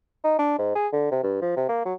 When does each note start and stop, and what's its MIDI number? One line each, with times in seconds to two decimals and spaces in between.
0.24 0.35 63
0.39 0.58 62
0.59 0.74 44
0.75 0.88 68
0.93 1.09 50
1.11 1.19 48
1.23 1.37 43
1.42 1.53 53
1.57 1.68 48
1.69 1.85 58
1.85 1.94 54